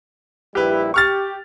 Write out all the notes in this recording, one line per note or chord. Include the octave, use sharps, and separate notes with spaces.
A#1 G3 E4 G4 B4
G4 C#6 F6 A6